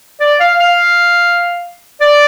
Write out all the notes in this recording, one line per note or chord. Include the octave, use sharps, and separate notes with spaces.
D5
F5
F5
D5